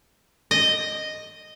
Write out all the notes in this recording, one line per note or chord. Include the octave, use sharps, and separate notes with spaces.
D#5